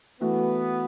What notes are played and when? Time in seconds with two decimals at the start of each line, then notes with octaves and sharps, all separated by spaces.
0.21 E3 A3 B3 F#4